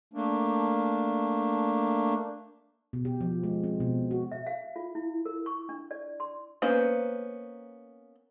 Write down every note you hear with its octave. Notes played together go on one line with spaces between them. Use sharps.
A3 A#3 D4
B2
G4
F3
G#3
C4
B2
F#4
E5
F5
F4
E4
A#4
C#6
D4
D5
C6
A#3 B3 C#4 C5